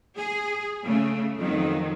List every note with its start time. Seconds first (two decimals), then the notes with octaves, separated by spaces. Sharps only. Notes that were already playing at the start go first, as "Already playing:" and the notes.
0.17 G#4
0.84 C#3 A3
1.37 F2 D#3 F#3